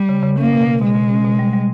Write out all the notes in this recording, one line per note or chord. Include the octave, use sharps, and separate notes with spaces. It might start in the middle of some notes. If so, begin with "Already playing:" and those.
Already playing: G3
C#3
C#3
A#3 C#4
B2
B2
B2 G#3
B2
C#4
B2
G3
G3